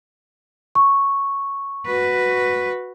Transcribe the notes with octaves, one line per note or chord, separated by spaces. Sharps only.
C#6
F#4 B4